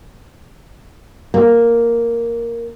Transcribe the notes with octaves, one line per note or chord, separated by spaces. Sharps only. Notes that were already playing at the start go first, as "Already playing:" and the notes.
A#3